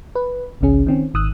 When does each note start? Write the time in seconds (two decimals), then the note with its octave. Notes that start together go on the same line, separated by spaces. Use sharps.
0.15 B4
0.61 G#1 C#2 C#3 C#4 G#4
0.87 D#3 C4 C#4
1.14 G#1 D#3 D#6 E6 F#6